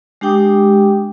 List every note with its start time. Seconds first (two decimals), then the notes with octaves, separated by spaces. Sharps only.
0.21 G#3 D4 G4 G5 D6 D#6